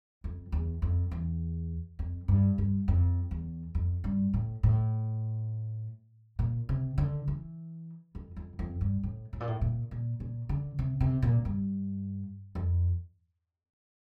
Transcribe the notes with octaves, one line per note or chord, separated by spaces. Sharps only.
F2
E2
F2
E2
F2
G2
G2
F2
E2
F2
G2
A2
A2
A#2
C3
D3
E3
F2
F2
F2
G2
A2
A2
A#2
A2
A#2
A#2
A#2
D3
C3
C3
A#2
G2
F2